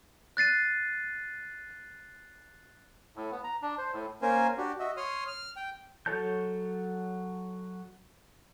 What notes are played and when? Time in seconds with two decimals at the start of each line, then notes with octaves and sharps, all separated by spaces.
0.37 F#6 A6 C7 D#7
3.16 A2
3.32 B3
3.44 A#5
3.62 D4
3.78 C5
3.94 A2
4.22 A#3 C#4 A#4 C5 G#5
4.57 D4 F#4 G4
4.80 F#4 D#5 E5
4.97 C#5 C6 D#6 F6
5.27 F6
5.57 G5
6.06 F#3 A4 C#5 A5 G6